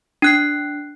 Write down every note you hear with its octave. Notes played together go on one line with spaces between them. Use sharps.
D4 F#6 C7